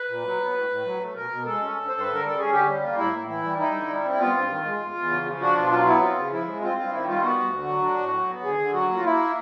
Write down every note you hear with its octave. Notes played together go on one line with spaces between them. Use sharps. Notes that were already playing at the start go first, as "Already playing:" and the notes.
Already playing: B4
A#2
F#3
B3
A2
A2
F#3
A3
B2 A#4
B2
G#3 A4
C#4
G2
G2 C5
B4
D3
A#4
G3 A4
C#4 G#4
D3 G4
G3
A#3 F4
A2 E4
A2
E3 E4
G3
D#4 E4
D3
G3
C4
E4
B3 F4
G2
D#3
G#3
E2
E2
C#3
F3
D4 F#4
B2 F4
F#3 F4
B3 E4
C4 F4
C#3
F3 E4
G#3
C4 F4
G2 F4
D#3 E4
G3 F4
B3 F#4
D2
D3
F#3
D4
A2
F#3
B3
D3 G#4
D3
F#3 F#4
A#3
F4
A#3 E4